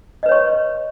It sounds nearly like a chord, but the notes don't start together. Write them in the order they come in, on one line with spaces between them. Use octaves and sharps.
D#5 B4 C#5 C#6